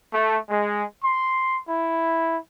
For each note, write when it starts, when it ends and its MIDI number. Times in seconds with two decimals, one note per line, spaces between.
0.13 0.38 57
0.49 0.84 56
1.04 1.59 84
1.69 2.37 64